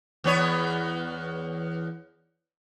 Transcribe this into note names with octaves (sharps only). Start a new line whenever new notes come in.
E2 B3 C#5